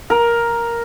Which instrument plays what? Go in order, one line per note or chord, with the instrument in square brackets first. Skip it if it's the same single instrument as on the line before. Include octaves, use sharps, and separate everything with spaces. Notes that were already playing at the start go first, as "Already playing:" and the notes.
[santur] A#4